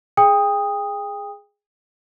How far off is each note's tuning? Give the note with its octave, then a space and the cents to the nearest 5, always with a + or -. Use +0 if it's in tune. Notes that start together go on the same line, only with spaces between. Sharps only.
G#4 +0 G5 +35 D#6 +0